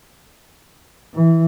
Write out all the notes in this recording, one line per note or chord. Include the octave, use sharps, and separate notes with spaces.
E3